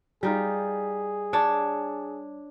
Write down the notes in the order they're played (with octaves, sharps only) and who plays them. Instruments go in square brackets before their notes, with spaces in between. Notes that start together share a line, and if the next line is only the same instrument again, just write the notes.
[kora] G3 D#4 F4 [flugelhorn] G#4
[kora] D4 [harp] C#5 D5 A5